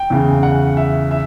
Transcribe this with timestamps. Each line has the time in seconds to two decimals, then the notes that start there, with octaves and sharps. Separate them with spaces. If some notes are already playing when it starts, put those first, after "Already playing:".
Already playing: G5
0.10 E2 C#3 E3
0.43 F#5
0.77 E5
1.11 E5